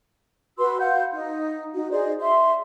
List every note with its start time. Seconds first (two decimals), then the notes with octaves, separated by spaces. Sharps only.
0.58 F#4 B4 C6 E6
0.79 F5 F#5 G6
1.13 D#4
1.74 D#4 F#4
1.91 G#4 C5 D5 D#5
2.19 E5 C6